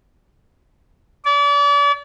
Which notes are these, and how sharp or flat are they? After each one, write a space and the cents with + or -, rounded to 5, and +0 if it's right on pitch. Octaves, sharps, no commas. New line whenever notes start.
D5 -40